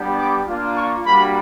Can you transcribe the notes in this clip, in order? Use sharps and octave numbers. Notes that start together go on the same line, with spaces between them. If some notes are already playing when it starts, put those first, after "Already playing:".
Already playing: G3 B3 D4 G4
D6
A#3 D4 F4
C#6
G3 A#3 D4 F#4 B5